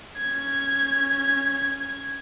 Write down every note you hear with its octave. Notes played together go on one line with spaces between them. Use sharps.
C#4 G#6